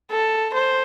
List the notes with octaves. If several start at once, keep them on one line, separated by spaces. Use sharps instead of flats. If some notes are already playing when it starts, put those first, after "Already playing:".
A4
C5